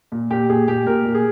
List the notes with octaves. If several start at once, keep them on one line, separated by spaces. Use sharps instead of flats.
A#2
A#2 G4
A#2 G#4
A#2 G4
A#2 A#4
A#2
G#4